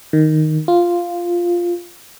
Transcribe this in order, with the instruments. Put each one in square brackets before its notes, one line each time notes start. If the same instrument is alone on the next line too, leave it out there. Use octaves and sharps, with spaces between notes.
[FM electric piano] D#3
F4